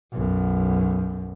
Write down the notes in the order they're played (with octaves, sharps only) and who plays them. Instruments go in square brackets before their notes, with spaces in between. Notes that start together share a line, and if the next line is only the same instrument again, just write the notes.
[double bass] B1 F#2